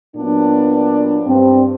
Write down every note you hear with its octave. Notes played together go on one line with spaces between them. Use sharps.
A#2 F#3 B3 D4
G2 C4